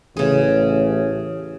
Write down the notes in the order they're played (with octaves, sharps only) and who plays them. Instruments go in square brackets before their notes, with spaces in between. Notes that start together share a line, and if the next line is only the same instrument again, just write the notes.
[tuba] A1 [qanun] C#3 G#4